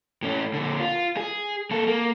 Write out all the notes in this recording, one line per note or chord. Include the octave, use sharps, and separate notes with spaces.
A2 C#4
A#2 D3
F4
G#4
A#3 A4
A#3